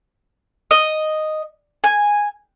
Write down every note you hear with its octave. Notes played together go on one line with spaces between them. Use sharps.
D#5
G#5